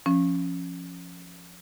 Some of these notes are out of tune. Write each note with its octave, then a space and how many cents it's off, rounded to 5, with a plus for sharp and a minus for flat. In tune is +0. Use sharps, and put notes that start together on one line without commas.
F3 +0 C#4 -10